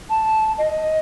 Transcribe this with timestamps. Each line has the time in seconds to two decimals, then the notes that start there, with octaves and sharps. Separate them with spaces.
0.10 A5
0.58 D#5